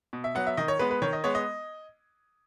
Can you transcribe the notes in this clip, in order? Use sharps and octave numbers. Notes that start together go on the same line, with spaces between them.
B2
E5
F#3 B3 F#5
E5
D#3 D#5
C#5
G#3 B3 B4
B4
D#3 C#5
D#5
G#3 B3 C#5
D#5